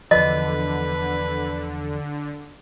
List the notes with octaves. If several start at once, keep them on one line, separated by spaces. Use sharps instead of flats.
E2 D3 F3 B4 D#5